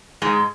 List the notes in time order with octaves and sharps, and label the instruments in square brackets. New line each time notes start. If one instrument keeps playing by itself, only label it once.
[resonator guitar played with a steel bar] G#2 G#3